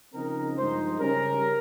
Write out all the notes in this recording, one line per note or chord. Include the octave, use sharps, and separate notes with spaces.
C#3 F3 C4 D#4 A#4
G2 F3 G#3 D#4 C5
C#3 G3 C#4 A#4